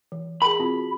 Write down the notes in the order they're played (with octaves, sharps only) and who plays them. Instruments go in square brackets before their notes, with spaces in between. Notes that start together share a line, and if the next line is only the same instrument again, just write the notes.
[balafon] E3
[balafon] G#4 A#4 [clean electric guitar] B5
[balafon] C4 F4 F#4